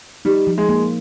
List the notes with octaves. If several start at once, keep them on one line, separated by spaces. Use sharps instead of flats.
G3 D#4
F3
G#3
A#3